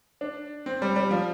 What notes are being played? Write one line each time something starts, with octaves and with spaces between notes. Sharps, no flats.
D4
C4
G3
G3
F3